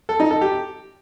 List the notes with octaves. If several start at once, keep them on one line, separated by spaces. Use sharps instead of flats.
A4
D#4
A4
G4